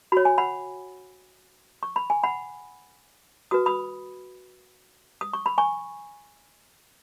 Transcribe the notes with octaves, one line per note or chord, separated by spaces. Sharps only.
F#4 C#5 B5
G#5
F#5 B5
C#6
B5
G#5
F#5 B5
F#4 B4 D#6
B5 D#6
D#6
C#6
B5
G#5 C#6